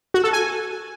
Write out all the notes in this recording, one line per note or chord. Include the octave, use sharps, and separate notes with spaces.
F#4
A4
G#5